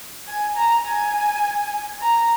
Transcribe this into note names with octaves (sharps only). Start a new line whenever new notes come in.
G#5
A#5
G#5
A#5